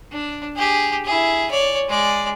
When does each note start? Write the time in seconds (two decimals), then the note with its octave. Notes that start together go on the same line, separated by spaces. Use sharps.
0.12 D4
0.56 G4 G#4
1.05 E4 G#4
1.51 C#5 D5
1.89 G#3 D5